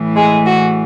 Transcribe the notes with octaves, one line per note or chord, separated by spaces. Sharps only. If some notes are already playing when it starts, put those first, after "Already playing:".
Already playing: A2 E3
G#3 G#4
F#4